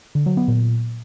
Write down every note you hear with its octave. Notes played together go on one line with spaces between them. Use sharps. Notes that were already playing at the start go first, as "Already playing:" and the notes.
D3
F#3
B3
A#2